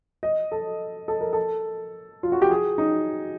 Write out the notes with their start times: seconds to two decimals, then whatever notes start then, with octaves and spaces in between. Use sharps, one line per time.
0.23 D#5
0.52 A4
1.08 A4
1.21 A#4
1.33 A4
2.23 F4
2.32 F#4
2.42 G4
2.50 G#4
2.78 D#4